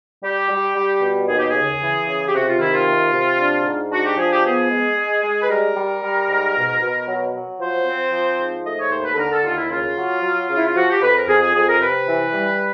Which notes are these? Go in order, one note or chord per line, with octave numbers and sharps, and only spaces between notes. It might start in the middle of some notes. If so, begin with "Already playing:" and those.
G3 G4
G3
G3
B2
D#2 G#4
G4
G#4
C#3
E3
C#3
G4
C3 F#4
F4
D#3 E4
F4
C3
C3
D4
G#2
D4 F#4
G4
F3 G#4
G4
B3 G#4
G#3
G#3
G#3
B4
G3 A#4
G3
G3
G#2
B2
B2
F#3
F#3
F3 C5
C4
F3
G#2
A3 D#5
C#5
D#2 C5
B4
A4
D3 A#4
A4
D#2 F4
E4
C#3 F4
F#3
F#3
C#3
E4
F4
F3 F#4
G4
F2 B4
A#4
F2 G#4
G#4
F2 G#4
A#4
C3 B4
E3
G3